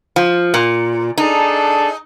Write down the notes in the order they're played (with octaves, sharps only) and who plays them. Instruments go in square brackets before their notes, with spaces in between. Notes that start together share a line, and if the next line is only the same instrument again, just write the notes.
[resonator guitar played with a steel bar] F3
A#2
[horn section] D4 G#4 A4 [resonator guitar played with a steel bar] D#4